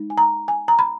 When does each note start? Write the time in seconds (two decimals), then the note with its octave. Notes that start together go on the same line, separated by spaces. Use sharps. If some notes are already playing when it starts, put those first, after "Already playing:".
Already playing: G#3 D#4
0.10 G#5
0.18 A#5
0.48 G#5
0.68 A#5
0.79 B5